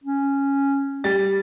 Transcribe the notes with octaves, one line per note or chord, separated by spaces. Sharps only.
C#4
G3 A6